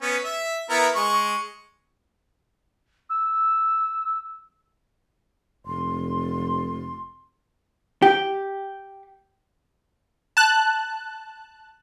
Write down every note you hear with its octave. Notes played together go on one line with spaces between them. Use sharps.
B3 C#4
E5
B3 E4 A#4
G#3 C#6
E6
F1 C6
G4
A5 F#6